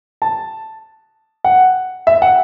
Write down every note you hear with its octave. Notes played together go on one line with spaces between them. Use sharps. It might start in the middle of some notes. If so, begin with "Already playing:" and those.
A5
F#5
E5
F#5